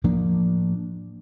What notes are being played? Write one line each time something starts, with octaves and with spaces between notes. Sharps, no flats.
A2 F3 A#3 D4